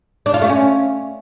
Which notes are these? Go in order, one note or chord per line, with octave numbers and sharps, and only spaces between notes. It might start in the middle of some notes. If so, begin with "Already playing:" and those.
D4
F4
A3
C#4